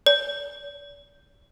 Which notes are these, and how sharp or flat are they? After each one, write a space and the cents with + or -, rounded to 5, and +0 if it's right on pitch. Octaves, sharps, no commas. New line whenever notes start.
D5 -40